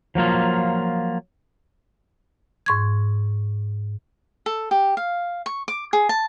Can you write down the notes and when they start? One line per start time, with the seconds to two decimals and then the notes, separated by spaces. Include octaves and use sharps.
0.15 F3 F#3 A#3 F4
2.66 G#2 C#6 G#6
4.46 A4
4.71 G4
4.97 F5
5.46 C#6
5.68 D6
5.93 G#4
6.09 A5